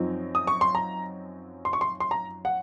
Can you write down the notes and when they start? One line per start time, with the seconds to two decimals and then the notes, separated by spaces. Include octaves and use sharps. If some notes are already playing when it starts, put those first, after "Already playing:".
Already playing: F#2 F3 C4 D#4
0.35 D#6
0.47 C#6
0.61 C6
0.75 A#5
1.65 C6
1.73 C#6
1.81 C6
2.00 C6
2.11 A#5
2.45 F#5